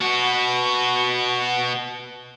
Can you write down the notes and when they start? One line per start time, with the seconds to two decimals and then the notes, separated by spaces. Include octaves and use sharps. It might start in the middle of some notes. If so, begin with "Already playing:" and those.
0.01 B2 F#4